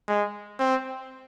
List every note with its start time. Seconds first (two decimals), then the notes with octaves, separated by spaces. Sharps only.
0.08 G#3
0.59 C4